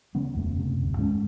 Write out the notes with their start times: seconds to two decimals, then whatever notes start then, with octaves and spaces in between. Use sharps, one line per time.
0.15 C#3 F#3 B3 C#4
0.35 D#1 F2 A3 B3
0.57 F#1 C3
0.83 D2
0.97 G#2 G#3 C#4